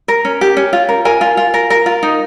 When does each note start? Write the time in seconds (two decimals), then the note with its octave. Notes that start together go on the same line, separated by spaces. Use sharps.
0.08 A#4
0.25 C#4
0.41 G4
0.57 C#4
0.73 F4
0.89 A#4
1.05 A#4 G#5
1.21 F4
1.37 F4
1.54 A#4
1.70 A#4
1.86 F4
2.03 D#4